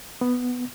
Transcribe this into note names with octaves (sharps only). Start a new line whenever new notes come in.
B3